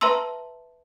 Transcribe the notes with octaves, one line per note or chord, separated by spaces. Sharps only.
B4 E5 A5 A#5 C6 E6